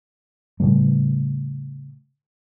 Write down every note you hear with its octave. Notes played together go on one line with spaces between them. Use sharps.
A2 C#3 G3 A3